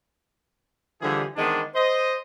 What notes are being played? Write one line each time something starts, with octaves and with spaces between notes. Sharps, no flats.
D3 E3 F3 G3 G4 G#4
D#3 E3 G#3 B3 C4 D4
C5 D#5